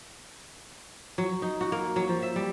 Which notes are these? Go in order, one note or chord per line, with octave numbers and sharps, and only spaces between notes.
F#3
D#4
F#4
A#3
F#3
F3
E5
G3